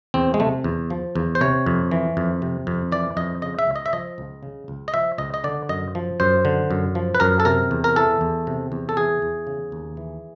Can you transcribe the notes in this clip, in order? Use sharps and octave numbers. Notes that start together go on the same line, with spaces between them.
E2 C4
G#3
C3 A3
E2
F3
E2
C5
C3 C#5
F2
E3
F2
C3
F2
E3 D5
F2 D#5
C#3 D#5
E5
C#2
D#5
E5
F3 D#5
C#2
C#3
C#2
D#5
F3 E5
C#2 D#5
D#5
D3 D5
F#2 D#5
F3
F#2 C5
D3
F#2
F3
B4
F#2 A#4
A4
C3 A#4
E2
A#4
E3 A4
E2
C3
E2
A4
E3 G#4
E2
C#3
D#2
E3